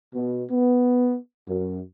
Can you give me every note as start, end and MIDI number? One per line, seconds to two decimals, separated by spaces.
0.14 0.44 47
0.51 1.16 59
1.48 1.80 42